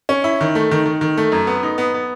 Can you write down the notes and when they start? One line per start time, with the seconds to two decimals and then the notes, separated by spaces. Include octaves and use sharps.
0.09 C#4
0.24 E4
0.41 D#3
0.55 A3
0.71 D#3
0.86 D#3
1.01 D#3
1.18 A3
1.32 F#2
1.47 B3
1.63 D#4
1.78 B3
1.94 B3